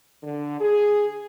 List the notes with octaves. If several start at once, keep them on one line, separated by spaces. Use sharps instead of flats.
D3
G#4